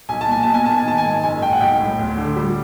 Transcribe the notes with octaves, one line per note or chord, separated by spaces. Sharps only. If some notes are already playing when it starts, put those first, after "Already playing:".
B1 G#5
A5
A#2 G#5
B2 A5
G#5
A#3 A5
G#5
D#3 A5
G#5
G#2
F#1 G#5
F#1 G5
F#5
B1 G5
A2
D2
D3
G3